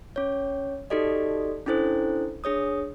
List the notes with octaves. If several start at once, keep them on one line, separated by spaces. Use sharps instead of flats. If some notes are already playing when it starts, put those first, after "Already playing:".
C#4 C#5
D#4 F#4 G4 A4 D5 D#5
C#4 D4 E4 A4 C5
D4 G#4 C#5 D#6